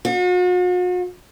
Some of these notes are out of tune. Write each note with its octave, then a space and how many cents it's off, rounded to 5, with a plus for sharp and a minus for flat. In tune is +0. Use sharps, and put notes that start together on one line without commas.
F#4 -45